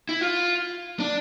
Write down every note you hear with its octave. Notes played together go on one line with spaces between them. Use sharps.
E4
F4
D4